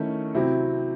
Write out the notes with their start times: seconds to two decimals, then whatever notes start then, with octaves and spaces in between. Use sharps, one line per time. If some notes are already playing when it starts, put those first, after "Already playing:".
Already playing: D#3 A3 C#4 E4 A4
0.35 C3 F#3 C4 E4